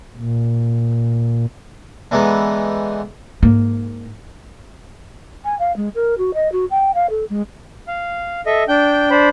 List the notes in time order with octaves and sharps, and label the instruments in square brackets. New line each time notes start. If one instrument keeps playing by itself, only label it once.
[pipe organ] A#2
[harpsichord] D3 E3 G#3 B3 D#4
[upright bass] G#2 A#3
[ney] G#5
F5
G#3
A#4
F#4
D#5
F#4
G5
F5
A4
G#3
[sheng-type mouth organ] F5
A4 D#5 E5
D4 G5 G6
D4 C5 B5